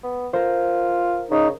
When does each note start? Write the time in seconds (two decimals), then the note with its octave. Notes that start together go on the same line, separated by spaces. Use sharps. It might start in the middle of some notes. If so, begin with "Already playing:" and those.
0.03 B3
0.33 F4 A#4 C5
1.31 C#3 D#4